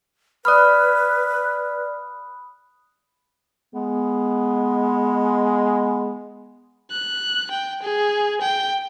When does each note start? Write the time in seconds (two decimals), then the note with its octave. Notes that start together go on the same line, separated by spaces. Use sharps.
0.45 B4 D5 B5 D#6 F6 F#6
3.75 G#3 B3
6.91 F#6
7.50 G5
7.82 G#4
8.41 G5